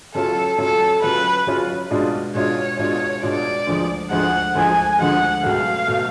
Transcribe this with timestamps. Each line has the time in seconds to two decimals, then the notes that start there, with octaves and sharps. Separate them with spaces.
0.15 C#3 F#3 C#4 F4 A4
0.58 C#3 F#3 C#4 F4 A4
1.02 C#3 F#3 C#4 F4 B4
1.47 C#3 F#3 C#4 F4
1.90 B2 G#3 D4 F4
2.35 B2 G#3 D4 F4 C#5
2.78 B2 G#3 D4 F4 C#5
3.22 B2 G#3 D4 F4 D5
3.67 D2 D3 F3 G#3
4.10 D2 D3 F3 G#3 F#5
4.55 D2 D3 F3 G#3 G#5
4.99 D2 D3 F3 G#3 F#5
5.43 C#2 B2 F#3 A3 F5
5.87 B2 F#3 A3